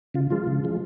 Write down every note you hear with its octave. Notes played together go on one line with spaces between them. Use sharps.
C#3 F4
F3 G#3 F4
C#3
F3 G#3